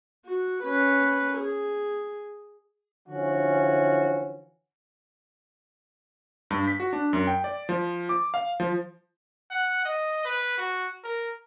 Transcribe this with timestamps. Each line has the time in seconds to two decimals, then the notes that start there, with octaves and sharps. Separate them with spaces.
0.25 F#4
0.63 C#4 B4
1.38 G#4
3.08 D3 E3 F3 C#4 F#4
6.51 G2
6.67 B6
6.80 F#4
6.93 D4
7.13 F#2
7.27 G5
7.44 D5
7.69 F3
8.09 D6
8.34 F5
8.60 F3
9.51 F#5
9.85 D#5
10.25 B4
10.58 F#4
11.04 A#4